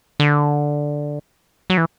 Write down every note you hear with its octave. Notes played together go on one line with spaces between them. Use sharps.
D3
F#3
E3